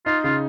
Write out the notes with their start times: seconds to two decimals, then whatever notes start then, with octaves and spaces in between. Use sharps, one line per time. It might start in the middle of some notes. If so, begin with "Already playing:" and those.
0.06 D#4 F4
0.24 C#3 F4